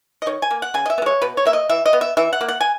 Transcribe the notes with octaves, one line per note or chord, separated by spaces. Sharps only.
D#5
D#3 C#5
G#5
A#3
F#5
C#3 G#5
D#5
E5
B3
G#3 C#5
B2 B4
C#5
A#3 E5
D#5
E3 E5
D#5
B3
E5
E3 E5
F#5
A#3
F#5
G#5